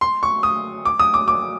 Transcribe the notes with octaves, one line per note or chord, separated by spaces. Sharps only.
C6
C#6
D#6
D6
D#6
D6
D6